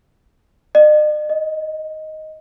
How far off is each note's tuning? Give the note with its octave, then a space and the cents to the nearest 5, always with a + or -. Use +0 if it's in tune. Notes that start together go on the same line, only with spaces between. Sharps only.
D#5 -45
D#5 +5